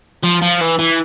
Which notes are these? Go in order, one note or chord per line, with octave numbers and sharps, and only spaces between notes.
F3
F3
E3
E3